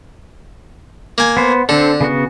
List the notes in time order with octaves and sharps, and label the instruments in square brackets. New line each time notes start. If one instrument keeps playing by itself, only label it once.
[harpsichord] A#3 G#5
[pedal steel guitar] B3 C5
[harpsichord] D3 [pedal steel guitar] C4 D4 A4
[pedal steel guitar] C#3 B3 F#4